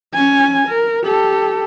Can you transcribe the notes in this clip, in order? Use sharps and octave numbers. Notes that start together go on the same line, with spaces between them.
C#4 G#5
A#4
G4 A4